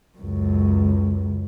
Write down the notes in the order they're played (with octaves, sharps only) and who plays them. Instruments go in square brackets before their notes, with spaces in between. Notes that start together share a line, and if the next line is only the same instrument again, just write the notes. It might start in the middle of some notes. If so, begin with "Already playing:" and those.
[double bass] C#2 F#2